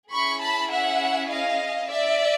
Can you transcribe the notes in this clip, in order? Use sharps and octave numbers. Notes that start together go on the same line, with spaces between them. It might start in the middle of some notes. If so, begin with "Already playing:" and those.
C#4 E4 G#4 B5 C#6
A5 B5
E5 F#5
D#5 F5
D5 E5